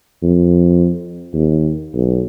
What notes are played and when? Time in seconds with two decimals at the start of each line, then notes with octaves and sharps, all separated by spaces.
0.23 F2
1.34 D#2
1.95 B1